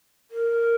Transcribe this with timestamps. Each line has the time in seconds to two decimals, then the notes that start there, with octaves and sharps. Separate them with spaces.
0.31 A#4